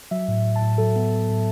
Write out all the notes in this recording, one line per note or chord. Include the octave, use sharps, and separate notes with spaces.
F#3 E5
A2
A2
A5
A2
F#3 A4
B3
B3
A2